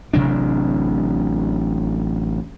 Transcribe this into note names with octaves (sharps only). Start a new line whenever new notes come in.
A1 C3 F#3 D4